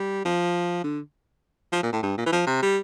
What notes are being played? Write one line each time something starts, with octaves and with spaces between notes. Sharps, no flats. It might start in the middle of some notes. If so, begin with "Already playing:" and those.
Already playing: G3
F3
D3
F3
A#2
A2
G2
A#2
E3
F3
C3
G3